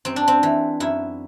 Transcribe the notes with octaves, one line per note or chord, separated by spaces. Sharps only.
F#2 C4
D4
C4
E3
F#2 E4